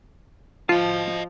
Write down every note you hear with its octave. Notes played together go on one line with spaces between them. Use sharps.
F3 F4 D#5 A5